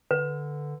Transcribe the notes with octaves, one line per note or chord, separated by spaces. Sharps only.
D3 B4